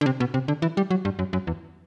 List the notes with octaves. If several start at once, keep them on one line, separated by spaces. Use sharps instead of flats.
D3
C3
B2
C3
D3
E3
G3
F#3
G2
F#2
F#2
E2